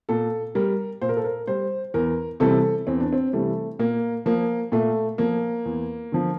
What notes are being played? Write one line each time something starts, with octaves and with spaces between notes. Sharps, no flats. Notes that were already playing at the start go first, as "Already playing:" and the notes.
A#2 A4
G3 A#4
A#2 C5
A#4
A4
A#4
G3 C5
E2 A#4
C3 E3 G3 A4
E2 C4
D4
C4
C3 E3 G3 A3
A#2 A#3
F3 A#3
A#2 A3
F3 A#3
E2
D3 F3